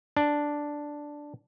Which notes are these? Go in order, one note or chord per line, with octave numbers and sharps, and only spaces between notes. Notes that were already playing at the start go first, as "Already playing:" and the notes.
D4